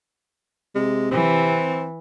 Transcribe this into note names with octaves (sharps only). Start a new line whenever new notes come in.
C3 G#3
E3 C4